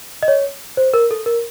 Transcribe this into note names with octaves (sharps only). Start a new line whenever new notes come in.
D#5
C#5
C5
A#4
A4
A#4